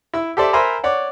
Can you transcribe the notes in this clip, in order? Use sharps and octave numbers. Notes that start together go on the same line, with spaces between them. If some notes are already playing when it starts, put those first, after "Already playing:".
E4 E6
G4 A4 C5 D5 E5
A#4 C5 E5 G#5 A#5 B5
C#5 D5 F#5